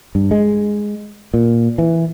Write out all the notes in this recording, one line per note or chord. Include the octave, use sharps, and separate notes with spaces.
G2
G#3
A#2
E3